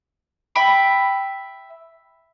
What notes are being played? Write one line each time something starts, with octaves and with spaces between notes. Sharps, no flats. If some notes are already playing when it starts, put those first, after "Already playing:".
E5 G5 B5